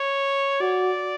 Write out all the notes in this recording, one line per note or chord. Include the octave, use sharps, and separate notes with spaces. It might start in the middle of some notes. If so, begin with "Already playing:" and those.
Already playing: C#5
F#4 D5